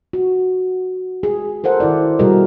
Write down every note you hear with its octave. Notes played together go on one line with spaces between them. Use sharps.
F#4
G#4
A4 A#4 C5 F#5
D#3 E4 D5
B2 G3 F#4 G#4 A#4 D#5